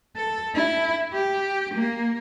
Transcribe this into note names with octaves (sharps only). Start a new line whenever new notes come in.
A4
E4
G4
A#3